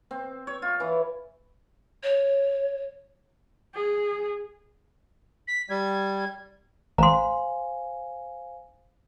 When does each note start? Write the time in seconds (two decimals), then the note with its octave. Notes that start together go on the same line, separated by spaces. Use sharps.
0.11 C4
0.47 C#5
0.62 F4
0.80 E3
2.03 C#5
3.74 G#4
5.48 B6
5.69 G3 G#6
6.98 A1 C5 F5 G#5 A#5 C6